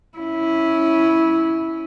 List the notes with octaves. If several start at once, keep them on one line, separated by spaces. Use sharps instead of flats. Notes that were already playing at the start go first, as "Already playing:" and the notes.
C#4 E4